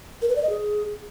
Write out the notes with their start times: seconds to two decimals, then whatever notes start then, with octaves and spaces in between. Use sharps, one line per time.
0.22 A#4
0.29 B4
0.36 D5
0.43 D#5
0.49 G#4